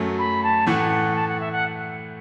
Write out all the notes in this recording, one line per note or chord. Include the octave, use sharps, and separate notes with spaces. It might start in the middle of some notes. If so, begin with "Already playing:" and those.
Already playing: F#2 F#3 A3
B5
A5
A2 E3 A3 F#5
A5
F#5
E5
F#5